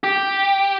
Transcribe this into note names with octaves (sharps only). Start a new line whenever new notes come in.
G4